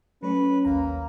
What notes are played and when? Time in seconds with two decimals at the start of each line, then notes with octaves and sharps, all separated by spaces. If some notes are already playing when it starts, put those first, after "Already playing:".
0.23 F#3 A3 C#4 B4 C#5
0.65 A1 D#2 A#3 A#5